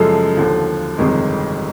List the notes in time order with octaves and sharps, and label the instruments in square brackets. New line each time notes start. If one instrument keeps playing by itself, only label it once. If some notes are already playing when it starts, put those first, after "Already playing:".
Already playing: [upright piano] F#2 C#3 F3 G#3 [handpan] A4
[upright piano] D#2 D3 F3
G1 F2 C3 D#3 G#3